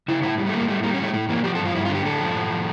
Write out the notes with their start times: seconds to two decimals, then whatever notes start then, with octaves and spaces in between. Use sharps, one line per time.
0.08 C#3 E4
0.22 A2 E4
0.38 G3
0.47 A3
0.53 A2 A#3
0.68 G3 A3
0.83 G3 A#3
0.94 C#4
0.99 A2 A3
1.13 A2 A3
1.29 E3 A#3
1.44 F3 G4
1.55 A4
1.59 G2
1.65 F4
1.75 G2 E4
1.85 F4
1.90 D3
1.95 G4
2.05 A2 A4
2.20 F3
2.35 A2
2.50 F3